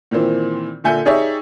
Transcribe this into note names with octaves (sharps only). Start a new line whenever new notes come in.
A#2 D#3 E3 C4
A#2 D3 E5 G#5 G6 C#7
D#4 G4 G#4 C#5 D5 E5